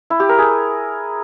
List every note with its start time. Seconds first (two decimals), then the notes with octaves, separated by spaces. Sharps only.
0.10 E4
0.20 G4
0.29 A#4
0.39 G#4